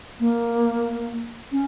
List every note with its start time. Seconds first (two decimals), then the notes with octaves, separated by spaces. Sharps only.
0.20 A#3
1.52 C#4